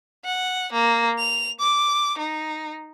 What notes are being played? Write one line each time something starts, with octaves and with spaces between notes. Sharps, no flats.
F#5
A#3
F7
D6
D#4